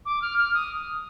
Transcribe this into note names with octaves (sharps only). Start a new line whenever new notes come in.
D6
F6
F6
D#6